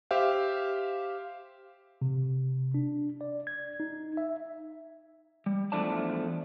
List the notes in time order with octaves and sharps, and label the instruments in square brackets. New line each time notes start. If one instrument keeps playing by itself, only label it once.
[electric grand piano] G4 C5 E5 F5
[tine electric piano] C3
D4
D5
G#6
D#4
E5
[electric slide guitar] G3
E2 F3 A3 D4 D5 A5